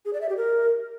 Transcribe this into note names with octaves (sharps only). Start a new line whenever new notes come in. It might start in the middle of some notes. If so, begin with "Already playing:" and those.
G#4
D5
E5
G4
A#4